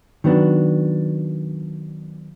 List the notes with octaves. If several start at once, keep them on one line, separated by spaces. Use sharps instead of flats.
D#3 F#3 B3 D4